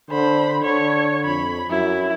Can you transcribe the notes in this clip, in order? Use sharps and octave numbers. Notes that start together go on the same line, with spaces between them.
D3 C5 B5
D3 C#5
F2 B5
F#2 E4